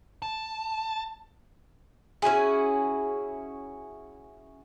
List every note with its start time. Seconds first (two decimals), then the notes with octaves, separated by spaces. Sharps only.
0.22 A5
2.22 C#4 E4 F#4 G#4